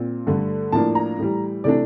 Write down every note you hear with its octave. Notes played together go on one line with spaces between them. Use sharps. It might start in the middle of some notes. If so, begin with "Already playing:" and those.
Already playing: A#2 C4
G2 D3 A3
A2 F3 A#3 D4 A5
A#5
A2 E3 G3
C3 E3 A3 D4 D5